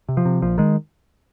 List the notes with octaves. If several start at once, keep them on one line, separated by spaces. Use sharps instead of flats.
C3
F3
C3
A#1 F3
D#3 G#3